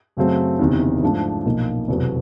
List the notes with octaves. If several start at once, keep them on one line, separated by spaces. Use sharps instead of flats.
F#2 C#3 F#3 A3 C4
F#1 E2 C3 D#3
G#2 F3 A3 D4
B1 A#2 F3 A#3 D#4
F1 E2 B2 F#3 B3